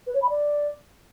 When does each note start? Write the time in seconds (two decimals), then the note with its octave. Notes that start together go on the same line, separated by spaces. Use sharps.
0.07 B4
0.14 C#5
0.22 B5
0.29 D5